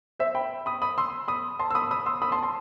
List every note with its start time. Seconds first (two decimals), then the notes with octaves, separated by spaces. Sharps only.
0.19 C5 E5
0.35 G5 B5
0.66 B5 D#6
0.82 B5 D#6
0.98 C6 E6
1.28 B5 D#6
1.59 A5 C6
1.71 E6
1.75 B5 D#6
1.91 B5 D#6
2.06 C6 E6
2.22 B5 D#6
2.32 A5 C6
2.43 A5 C6